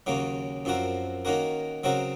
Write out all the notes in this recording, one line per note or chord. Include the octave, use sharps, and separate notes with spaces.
D#2 C#3 F#3 A#3 C#4
F#2 F3 C4 F#4 A#4
D#3 A#3 C#4 F#4 A#4
C#3 F#3 C4 F#4 A#4